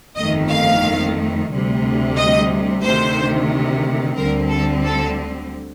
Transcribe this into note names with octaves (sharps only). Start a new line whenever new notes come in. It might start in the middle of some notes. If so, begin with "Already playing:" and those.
G1 F2 D#3 A3 D#5
F5
D2 C3 G3
D#5
D2 C3 D#3 C5
D2 D3 G3 C4 A#4
A4
A4